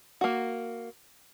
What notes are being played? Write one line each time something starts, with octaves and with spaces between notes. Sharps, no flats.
A#3 F#4